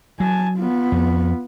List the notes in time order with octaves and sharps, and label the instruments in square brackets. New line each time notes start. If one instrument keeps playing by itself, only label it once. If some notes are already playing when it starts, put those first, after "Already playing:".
[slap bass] F#3 [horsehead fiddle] G#5 A5
[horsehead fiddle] B3 F4
[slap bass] F2